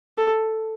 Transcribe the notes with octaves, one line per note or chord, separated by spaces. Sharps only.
A4